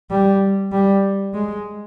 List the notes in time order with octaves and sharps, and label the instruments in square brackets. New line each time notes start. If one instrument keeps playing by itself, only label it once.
[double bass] G3
G3
G#3